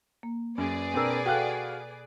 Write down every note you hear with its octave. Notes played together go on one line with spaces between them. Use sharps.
A#3
F#2 G#4 B4 D5
B2 C4 D4 A#4 E6
F#4 A4 F5 G5 F#6